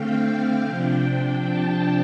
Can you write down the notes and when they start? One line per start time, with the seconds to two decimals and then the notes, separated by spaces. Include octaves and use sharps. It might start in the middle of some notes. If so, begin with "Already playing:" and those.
Already playing: D3 A3 C4 F5 G5
0.23 G5
0.64 C3 F3 D4 G5
1.48 A5